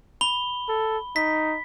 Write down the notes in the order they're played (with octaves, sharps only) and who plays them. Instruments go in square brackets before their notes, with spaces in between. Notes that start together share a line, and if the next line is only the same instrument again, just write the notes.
[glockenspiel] B5 G7
[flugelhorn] A4
[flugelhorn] D#4 [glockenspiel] B6